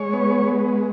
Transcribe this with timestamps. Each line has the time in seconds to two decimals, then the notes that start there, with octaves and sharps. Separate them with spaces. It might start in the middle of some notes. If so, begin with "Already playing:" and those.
Already playing: G#3 C#5
0.13 B3
0.43 G#3